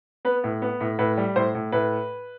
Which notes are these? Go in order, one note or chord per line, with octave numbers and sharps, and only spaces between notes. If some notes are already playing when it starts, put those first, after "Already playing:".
B3 B4
A2
B3
A2
A2 B4
G3
A2 C5
A2
A2 B4